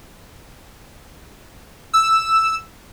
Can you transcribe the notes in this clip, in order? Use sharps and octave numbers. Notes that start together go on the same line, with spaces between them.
E6